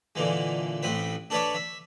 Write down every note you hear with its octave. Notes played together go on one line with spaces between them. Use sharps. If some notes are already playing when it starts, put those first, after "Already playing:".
A#2 D3 E3 G#3
A1 A2 C4 B4
D4 A4 B4 C#5 D5 E5
E5